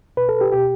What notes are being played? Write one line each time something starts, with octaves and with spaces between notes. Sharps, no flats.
B2 B4
A4
G4
B2 G4